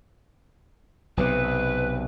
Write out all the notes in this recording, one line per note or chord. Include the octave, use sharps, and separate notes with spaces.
B1 C3 B4